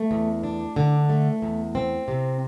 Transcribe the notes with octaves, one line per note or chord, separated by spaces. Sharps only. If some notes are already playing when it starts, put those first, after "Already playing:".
Already playing: A3
E2
D4
D3
A3
E2
C4
C3